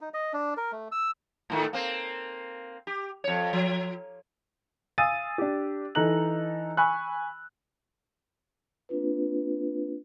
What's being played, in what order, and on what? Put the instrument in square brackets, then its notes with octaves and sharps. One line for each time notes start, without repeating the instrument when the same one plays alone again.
[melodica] D#4
D#5
D4
A#4
A3
E6
[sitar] A2 D#3 A3
A#3 C4
G4
F2 C#5
F3
[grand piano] F5 G#5 D#6 E6 A6 D#7
D4 G4
E3 D#4 A4 A#5 F#6 F#7
G#5 B5 C#6 E6 F#6
[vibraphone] A#3 C4 D4 F4 B4